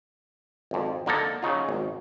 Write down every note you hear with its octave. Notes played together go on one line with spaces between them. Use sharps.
G#1 F2
D3 A#3 D#4 A4
C#3 F#3 D#4 F4
G#1